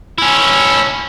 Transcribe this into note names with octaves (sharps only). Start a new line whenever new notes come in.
C#4 E4